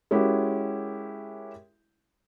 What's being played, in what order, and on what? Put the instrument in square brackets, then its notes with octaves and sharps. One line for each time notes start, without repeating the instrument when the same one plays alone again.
[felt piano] G#3 C#4 E4 F#4 G4 A#4